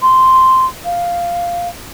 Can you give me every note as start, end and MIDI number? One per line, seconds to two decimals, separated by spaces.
0.02 0.66 84
0.85 1.68 77